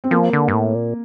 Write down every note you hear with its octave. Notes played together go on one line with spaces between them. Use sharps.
C4
F3 A#3
D3
G2
A2
A#2